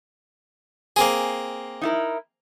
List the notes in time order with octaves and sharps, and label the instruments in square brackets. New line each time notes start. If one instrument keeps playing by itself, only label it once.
[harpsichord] A#3 C4 G#4 [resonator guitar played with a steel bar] G#5
[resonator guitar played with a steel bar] D#4 E4 A#4